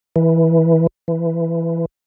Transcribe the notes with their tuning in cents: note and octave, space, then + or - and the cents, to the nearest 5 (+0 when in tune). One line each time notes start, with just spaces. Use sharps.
E3 -10
E3 +15